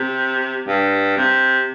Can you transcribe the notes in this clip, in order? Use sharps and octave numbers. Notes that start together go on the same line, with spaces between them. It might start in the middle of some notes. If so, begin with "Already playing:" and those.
Already playing: C3
G2
C3